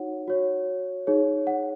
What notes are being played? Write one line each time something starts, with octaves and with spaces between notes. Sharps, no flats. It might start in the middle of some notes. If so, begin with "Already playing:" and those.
Already playing: D#4 F#4 C#5 F#5
F#4 C#5
D#4 G#4 C#5
F#5